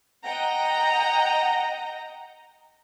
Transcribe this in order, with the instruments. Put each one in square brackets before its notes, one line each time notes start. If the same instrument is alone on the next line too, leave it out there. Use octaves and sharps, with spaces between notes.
[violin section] D#5 F#5 G5 A#5